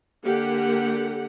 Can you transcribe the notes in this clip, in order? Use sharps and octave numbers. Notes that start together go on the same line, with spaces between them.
D3 A#3 G4 F#5